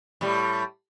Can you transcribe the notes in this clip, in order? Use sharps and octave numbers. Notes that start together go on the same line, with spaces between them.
A2 G3